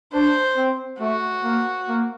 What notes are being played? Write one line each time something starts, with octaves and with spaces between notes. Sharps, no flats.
D4 C5
C4
A3 F#4
A#3
A#3